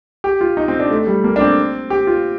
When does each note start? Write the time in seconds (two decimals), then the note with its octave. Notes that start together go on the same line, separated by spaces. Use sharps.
0.24 G4
0.41 F4
0.57 D#4
0.68 C4
0.80 D4
0.90 A3
1.07 G3
1.24 A#3
1.36 D4
1.41 C4
1.90 G4
2.07 F4